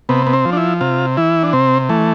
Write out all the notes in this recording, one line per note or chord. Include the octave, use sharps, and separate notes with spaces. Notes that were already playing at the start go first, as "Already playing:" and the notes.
C3 B3
B3
C4
F3
D4
E4
C3 F4
E3 E4
D4
C3 C4
E3 A3